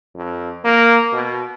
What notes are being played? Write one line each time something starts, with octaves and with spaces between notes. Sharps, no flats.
F2
A#3
B2